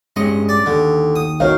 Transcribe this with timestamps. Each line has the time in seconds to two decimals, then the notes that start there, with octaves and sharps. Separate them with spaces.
0.16 G2 G#3 C#4 D#5
0.49 D5
0.66 D#2 D3
1.16 D#6
1.40 D#3 F#4 C#5 F5